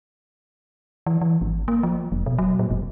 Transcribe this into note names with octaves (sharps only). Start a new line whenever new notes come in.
E3
E3
G#1
A#3
F3
F1
B2
F#3
A#2
F#1